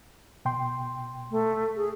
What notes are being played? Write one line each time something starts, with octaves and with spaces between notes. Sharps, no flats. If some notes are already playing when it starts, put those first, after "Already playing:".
B2 G5 C6
A3
G#4